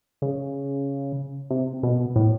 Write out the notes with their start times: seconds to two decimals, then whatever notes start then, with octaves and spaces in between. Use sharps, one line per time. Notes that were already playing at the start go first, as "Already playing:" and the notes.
0.22 C#3
1.51 C3
1.83 B2
2.16 A2